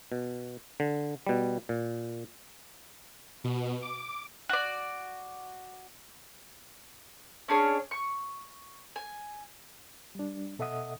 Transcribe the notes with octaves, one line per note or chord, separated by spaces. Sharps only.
B2
D3
B2 G3
A#2
B2
D6
F#4 D5
C#4 D4 G#4 C#5
C#6
G#5
G3 D4
B2 A4 D#5 E5 F#5 D#6